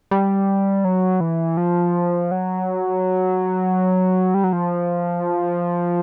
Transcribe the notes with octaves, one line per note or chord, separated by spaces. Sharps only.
G3
F#3
E3
F3
F#3
G3
F#3
F3